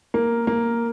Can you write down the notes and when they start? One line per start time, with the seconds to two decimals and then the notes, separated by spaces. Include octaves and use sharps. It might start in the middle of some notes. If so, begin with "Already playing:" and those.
0.14 A#3
0.47 A#3